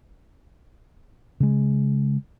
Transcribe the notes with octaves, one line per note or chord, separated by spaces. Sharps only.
C#3 G#3